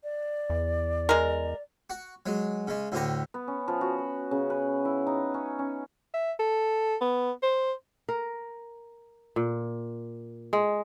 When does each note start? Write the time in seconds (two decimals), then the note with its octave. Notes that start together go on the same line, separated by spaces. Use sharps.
0.04 D5
0.50 E2
1.09 G#3 A#4
1.90 F#4
2.26 F#3 G#3
2.68 C#3 G#3
2.92 D2 A2 D3 G4 A#5
3.34 B3
3.48 C#4
3.68 F3
3.81 F#4
3.98 B5
4.31 C#3
4.50 B4
4.85 E4
5.07 D#4
5.34 C#4
5.59 C#4
6.14 E5
6.39 A4
7.01 B3
7.43 C5
8.09 A#4
9.36 A#2
10.53 G#3